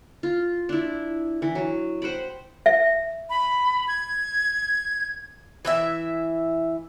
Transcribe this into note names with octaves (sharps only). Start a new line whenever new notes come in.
F4
D4 E4
E3
F#3
C5 F#5 G5 B5
E5
B5
G#6
E3 E4 E5